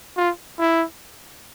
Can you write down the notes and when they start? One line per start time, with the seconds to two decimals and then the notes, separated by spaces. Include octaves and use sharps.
0.17 F4
0.59 E4